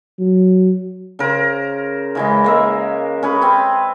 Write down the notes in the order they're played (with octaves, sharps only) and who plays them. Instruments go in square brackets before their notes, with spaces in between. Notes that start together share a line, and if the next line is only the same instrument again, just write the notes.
[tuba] F#3
[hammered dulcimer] C#3 A#4 C5
C#3 E3 G#3
G#3 A#3 E5
C#4 G#4 B4
C4 B4